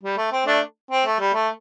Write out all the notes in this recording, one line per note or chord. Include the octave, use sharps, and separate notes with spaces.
G3
A3
C4
A3 D4
C4
A3
G3
A3